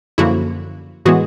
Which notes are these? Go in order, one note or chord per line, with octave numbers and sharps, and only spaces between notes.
F#2 D3 F3 A#3 E4 F#4
A2 E3 G#3 B3 F#4 G#4